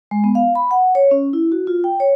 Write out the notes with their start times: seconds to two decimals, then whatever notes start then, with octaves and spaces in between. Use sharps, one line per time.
0.11 G#3
0.24 B3
0.35 F5
0.55 B5
0.71 F#5
0.95 C#5
1.11 C#4
1.33 E4
1.52 F#4
1.67 F4
1.84 G5
2.00 C#5